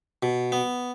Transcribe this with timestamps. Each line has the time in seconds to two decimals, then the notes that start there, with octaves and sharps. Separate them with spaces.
0.23 B2
0.52 B3